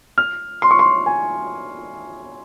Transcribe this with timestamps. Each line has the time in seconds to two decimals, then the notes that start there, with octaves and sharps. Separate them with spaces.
0.18 F6
0.62 C6
0.71 C#6
0.79 C6
1.06 G#5